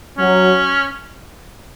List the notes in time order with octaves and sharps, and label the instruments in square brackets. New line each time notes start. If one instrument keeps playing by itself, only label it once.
[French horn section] F#3 [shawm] C#4